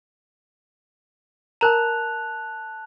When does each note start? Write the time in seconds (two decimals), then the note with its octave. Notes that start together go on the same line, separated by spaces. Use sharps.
1.61 A#4 A5 A#5 F#6 F7